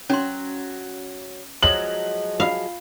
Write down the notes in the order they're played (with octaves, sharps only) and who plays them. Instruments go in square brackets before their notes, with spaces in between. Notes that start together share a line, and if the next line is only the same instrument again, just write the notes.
[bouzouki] F#3 [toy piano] C#4 C6
[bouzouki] F3 F#3 G#3 [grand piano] F#7
[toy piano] F4 [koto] F5